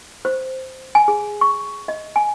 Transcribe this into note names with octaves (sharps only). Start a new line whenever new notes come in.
C5
G#5
G#4
C#6
D#5
G#5